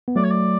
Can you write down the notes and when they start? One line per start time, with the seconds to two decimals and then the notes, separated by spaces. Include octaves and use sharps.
0.08 B3
0.16 F#3 A3 D5
0.24 C#5
0.31 D5